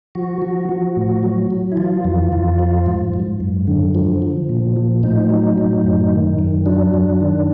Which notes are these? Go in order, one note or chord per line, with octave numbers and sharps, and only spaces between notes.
F3 F#4
F3
F3
A2
F#3
F#3
E4
E3 F4
F2
F2
F3
G#2
G#2
F#2
D3
F3
F3
A#2
F3
A2 D#4
F#3
A2
F#2
D#3
F#2
F#3 D4
F#2
D#3